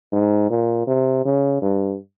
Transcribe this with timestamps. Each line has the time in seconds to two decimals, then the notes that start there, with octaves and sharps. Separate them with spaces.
0.13 G#2
0.50 A#2
0.87 C3
1.25 C#3
1.62 G2